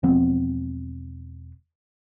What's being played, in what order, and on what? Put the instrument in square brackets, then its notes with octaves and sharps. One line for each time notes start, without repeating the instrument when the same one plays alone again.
[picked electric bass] E1 F3 B3 C4